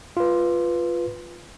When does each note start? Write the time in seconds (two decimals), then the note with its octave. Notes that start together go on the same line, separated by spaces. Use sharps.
0.17 F4 B4